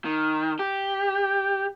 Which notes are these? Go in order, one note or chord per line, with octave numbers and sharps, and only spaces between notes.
D#3
G4